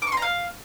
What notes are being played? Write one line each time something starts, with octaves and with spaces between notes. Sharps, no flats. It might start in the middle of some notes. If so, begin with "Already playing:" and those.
D6
C#6
C6
A#5
F5